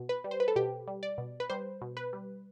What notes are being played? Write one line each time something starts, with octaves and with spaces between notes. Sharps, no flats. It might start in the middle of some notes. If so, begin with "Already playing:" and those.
Already playing: B2
B4
G3
C5
B4
A4
B2 G4
G3
D5
B2
B4
G3 C5
B2
B4
G3